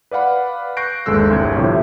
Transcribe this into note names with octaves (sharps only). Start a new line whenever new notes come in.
B4 D5 F5 F#5 B5
C#6 F#6 G6 A#6 C7 D7
G1 D#2 G#3 A4 E6 F#6
G1 C2 C4 G#6
A2 C3 F3 C#5 E5